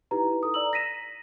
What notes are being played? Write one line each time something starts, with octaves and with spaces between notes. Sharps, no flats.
D#4 E4 G4 B4 A#5
A4 D#6
D5 A#5 E6 F#7
A#6 B6 D#7 E7